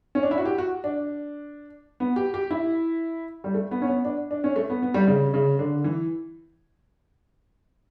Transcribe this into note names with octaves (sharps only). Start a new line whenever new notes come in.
C#4
D4
E4
F#4
G4
F#4
D4
B3
G4
G4
E4
G3
A3
B3
C#4
B3
D4
D4
C#4
A3
B3
B3
G3
C#3
C#3
D3
E3